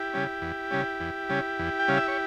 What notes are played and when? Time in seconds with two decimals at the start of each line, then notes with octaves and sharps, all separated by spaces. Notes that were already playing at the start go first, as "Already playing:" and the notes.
Already playing: E4 G4
0.13 C#3 G3 C#4
0.42 E2
0.71 C#3 G3 C#4
1.00 E2
1.29 C#3 G3 C#4
1.59 E2
1.79 G5
1.88 C#3 G3 C#4 F5
1.97 E5
2.08 C#5